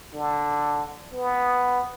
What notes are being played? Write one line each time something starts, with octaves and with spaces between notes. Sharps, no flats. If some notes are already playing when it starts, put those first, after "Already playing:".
D3
B3